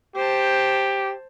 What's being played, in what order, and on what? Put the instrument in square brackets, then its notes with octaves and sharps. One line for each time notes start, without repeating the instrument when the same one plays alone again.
[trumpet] G4 [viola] C5 A5